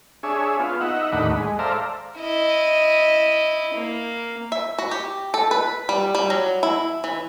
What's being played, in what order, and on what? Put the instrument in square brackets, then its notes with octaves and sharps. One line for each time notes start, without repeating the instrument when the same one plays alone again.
[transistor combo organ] D4 G#4 C#5 E5
B3 F4
D#4 E5 F#5
D#2 A2 D4 D#4 F#5 B5
G#3
A4 C5 D5 E5 F5 A#5
[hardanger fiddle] E4 D#5
A#3
[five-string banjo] E5
F#4
G4
A4
B4
G3
G3
F#3
E4
E3